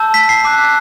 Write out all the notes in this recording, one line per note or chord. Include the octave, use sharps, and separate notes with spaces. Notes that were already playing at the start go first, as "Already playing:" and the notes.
Already playing: A5 E6 G6
B6
C7
A5 D6 F#6